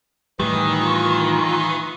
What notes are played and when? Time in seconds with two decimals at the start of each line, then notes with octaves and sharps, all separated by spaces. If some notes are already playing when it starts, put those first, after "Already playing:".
0.40 A2 D#3 E3 G3
0.78 F4